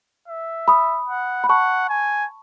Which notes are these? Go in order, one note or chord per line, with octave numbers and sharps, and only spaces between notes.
E5
B5 D#6
F#5
B5
F#5 A5 C#6
G#5